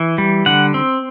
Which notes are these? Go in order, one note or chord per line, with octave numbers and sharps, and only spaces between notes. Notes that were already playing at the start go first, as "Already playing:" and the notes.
Already playing: E3
G3
D3 F#5
C4